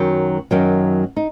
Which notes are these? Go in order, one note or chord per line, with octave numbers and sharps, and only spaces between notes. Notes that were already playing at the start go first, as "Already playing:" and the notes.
Already playing: F#2 D#3 F#3
F#2 D#3 F#3
D#4